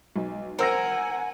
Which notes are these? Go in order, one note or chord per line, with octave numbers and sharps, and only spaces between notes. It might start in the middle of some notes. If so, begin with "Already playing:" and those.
B1
A#4 C5 F#5 G#5 E6 A#6